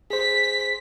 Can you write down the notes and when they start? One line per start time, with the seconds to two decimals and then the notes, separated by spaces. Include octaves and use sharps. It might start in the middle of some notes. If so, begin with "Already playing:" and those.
0.10 G#4 C5 B6